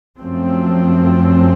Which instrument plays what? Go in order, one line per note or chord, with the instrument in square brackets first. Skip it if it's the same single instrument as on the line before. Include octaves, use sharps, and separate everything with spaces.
[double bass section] F#2 F3 A3 C4